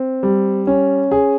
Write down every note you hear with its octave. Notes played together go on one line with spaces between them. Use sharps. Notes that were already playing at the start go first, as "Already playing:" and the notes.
Already playing: C4
G3
C#4
G#4